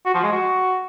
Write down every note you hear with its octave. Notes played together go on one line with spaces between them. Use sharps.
F#4
F3
G#3
F#4